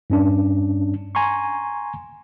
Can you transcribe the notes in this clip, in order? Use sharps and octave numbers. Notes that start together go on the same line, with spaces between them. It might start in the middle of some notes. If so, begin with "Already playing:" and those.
G2 C#4 D4
G#5 A#5 C6 C#6